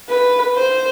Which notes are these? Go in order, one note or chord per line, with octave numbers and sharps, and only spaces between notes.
B4
C5